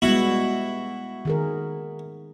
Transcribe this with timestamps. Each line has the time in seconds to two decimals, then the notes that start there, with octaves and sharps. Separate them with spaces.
0.02 G3 G#3 B3 E4 F#4
1.25 D#3 G#4 A#4